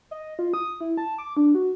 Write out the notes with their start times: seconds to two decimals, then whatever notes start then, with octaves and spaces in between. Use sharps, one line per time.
0.11 D#5
0.39 F4
0.54 D#6
0.81 E4
0.97 A5
1.18 D6
1.37 D4
1.55 F#4